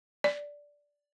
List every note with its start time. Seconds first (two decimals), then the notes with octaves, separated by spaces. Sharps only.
0.24 D5